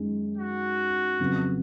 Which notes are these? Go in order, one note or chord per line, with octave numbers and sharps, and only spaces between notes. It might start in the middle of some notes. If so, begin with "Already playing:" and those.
Already playing: F#2 D#3 G#3
F#4
F2 C#3 F#3 B3